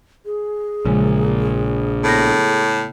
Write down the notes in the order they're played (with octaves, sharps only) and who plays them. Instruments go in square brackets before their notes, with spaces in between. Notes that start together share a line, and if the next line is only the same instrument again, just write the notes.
[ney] G#4
[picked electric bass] A#1 [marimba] C#3 G#3
[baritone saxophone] A2 [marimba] B3 A#6